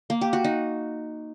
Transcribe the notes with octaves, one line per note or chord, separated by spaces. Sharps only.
A#3
G4
F#4
D#4